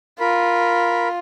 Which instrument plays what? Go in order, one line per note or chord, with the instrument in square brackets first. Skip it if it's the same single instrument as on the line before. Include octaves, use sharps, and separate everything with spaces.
[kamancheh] F4 [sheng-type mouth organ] A#4 B5